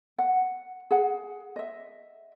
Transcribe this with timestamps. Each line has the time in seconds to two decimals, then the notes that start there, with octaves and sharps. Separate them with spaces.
0.18 F#5
0.91 G#4 F#5
1.56 D#5 E5